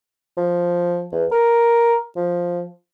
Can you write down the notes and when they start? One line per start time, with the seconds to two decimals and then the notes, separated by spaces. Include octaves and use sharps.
0.37 F3
1.13 E2
1.32 A#4
2.16 F3